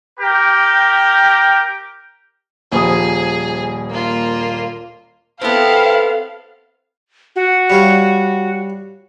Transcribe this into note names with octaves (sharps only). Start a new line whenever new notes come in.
G4 A#4 G5
D#1 F3 G#4 D#6
A#3 F4
B3 C4 E4 A4 F5
F#4
G3 C#5 F5